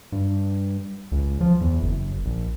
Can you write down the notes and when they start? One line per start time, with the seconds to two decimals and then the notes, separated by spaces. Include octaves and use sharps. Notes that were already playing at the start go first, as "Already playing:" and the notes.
0.12 G2
1.12 C#2
1.41 F3
1.61 E2
1.82 F#1
2.25 A#1